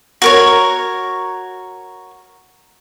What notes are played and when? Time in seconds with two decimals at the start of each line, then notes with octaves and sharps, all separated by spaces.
0.22 F#4 A#4 C#5